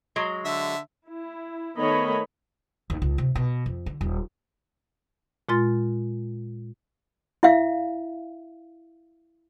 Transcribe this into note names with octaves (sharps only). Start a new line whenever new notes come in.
F#3 G#3
D3 E5
E4
D#3 A3 B3 C#5 D#5 B5
D#2
C#2
C3
B2
F2
D3
D#1
A#2 G#3 F4 C6 A6
E4 E5 F5